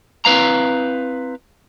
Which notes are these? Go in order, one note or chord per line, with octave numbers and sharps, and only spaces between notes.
C4 E4 B4 F5 A#5